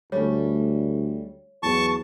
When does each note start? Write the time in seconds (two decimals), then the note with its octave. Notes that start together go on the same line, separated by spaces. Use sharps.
0.12 D2 G3 A3 C#4 C#5
1.63 E2 F#3 B3 A5 C#6